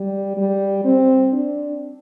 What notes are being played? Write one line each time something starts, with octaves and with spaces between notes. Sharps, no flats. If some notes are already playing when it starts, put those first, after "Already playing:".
Already playing: G3
G3
C4
D4